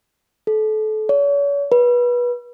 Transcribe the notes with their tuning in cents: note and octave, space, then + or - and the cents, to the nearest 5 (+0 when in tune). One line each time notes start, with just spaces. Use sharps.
A4 -30
C#5 +40
B4 -25